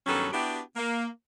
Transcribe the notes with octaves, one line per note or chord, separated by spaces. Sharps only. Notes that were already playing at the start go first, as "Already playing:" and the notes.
G2 D#3 F#3 B3 C#4 A4
B3 D4 E4 F#4 G4
A#3